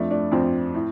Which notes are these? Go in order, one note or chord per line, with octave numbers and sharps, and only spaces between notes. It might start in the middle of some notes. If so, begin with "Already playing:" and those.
Already playing: F2 F3 A3 D4
A3 D4
F2 F3 C4
A2